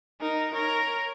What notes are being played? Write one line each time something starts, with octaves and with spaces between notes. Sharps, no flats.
D#4 A#4
A#4 C#5